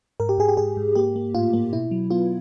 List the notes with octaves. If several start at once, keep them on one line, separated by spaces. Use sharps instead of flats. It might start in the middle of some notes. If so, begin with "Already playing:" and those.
G#2 A#4
G4
G#2 G#4
G4
G#2 G#4
G#2
A#3 G4
A#3
A2 F4
A#3
B2 E4
F#3
B3 F4